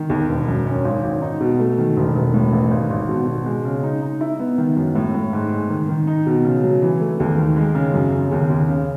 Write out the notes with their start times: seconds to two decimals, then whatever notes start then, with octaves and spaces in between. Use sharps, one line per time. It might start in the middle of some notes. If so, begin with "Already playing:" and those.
Already playing: D#3
0.10 D#2
0.29 E1
0.48 F#2
0.67 C#4
0.85 G#1
1.03 G#1
1.22 D#4
1.41 B2
1.60 A3
1.78 D#3
1.97 E1
2.16 E1
2.34 A2
2.53 A1
2.71 G#1
2.90 G#1
3.09 B2
3.27 B2
3.45 G#3
3.65 C#3
3.83 D#4
4.02 D#4
4.21 E4
4.39 B3
4.58 D#3
4.76 F#2
4.95 A2
5.14 A2
5.33 G#2
5.51 G#3
5.70 D#3
5.89 D#3
6.07 D#4
6.26 B2
6.45 C#3
6.63 F#3
6.82 E3
7.01 A3
7.20 D#2
7.38 D#3
7.57 G#3
7.75 C#3
7.94 F#2
8.12 C#3
8.32 D#2
8.50 D#2
8.69 C#3